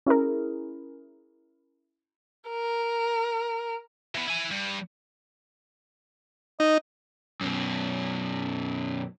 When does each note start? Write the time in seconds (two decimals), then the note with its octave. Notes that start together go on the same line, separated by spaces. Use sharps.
0.06 C#4 E4 G#4 A#4
2.50 A#4
4.15 E3 B3
4.28 E4 G#5
4.51 G2
6.60 D#4 D#5
7.41 F#2 B2